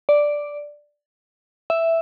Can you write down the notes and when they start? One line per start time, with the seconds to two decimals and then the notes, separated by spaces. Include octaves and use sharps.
0.09 D5
1.70 E5